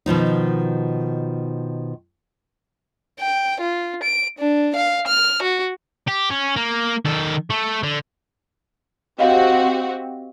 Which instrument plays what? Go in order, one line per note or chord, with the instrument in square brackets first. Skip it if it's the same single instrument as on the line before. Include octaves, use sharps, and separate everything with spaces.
[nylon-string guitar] B2 D#3 F3 D#4
[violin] G5
F4
D7
D4
F5
F6
F#4
[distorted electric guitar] G4
C#4
A#3
D#3 A4
A3
D3
[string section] C4 F#4 G4 [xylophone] D#5 F5